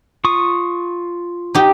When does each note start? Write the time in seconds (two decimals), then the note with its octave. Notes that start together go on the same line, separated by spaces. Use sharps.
0.24 F4 C#6 D#6
1.55 D#4 G4